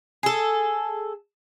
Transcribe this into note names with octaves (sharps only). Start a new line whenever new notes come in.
G#4 A4